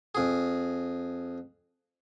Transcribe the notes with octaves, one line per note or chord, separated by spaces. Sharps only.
F2 G#4